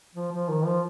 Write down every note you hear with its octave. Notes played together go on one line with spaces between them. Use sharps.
F3
F3
D#3
F3